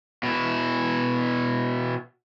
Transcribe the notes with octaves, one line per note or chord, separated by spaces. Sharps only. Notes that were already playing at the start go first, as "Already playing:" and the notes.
B2 E4